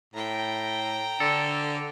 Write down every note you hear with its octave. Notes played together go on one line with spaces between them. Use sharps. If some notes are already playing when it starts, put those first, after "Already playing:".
A2 G5 A#5
D3 A4